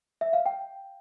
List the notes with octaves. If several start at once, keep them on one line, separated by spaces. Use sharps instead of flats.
E5
F5
G5